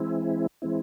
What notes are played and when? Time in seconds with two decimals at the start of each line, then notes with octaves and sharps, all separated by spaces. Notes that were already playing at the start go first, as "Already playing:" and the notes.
Already playing: E3 G#3 C4 E4
0.62 E3 G#3 C4 E4